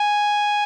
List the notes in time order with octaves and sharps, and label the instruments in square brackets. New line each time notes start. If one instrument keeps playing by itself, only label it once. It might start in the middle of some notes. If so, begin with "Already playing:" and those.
Already playing: [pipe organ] G#5